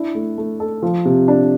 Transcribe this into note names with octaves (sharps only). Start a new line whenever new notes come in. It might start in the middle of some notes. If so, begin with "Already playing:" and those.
Already playing: D4 E4
A3
A3
A4
F3
C3
D4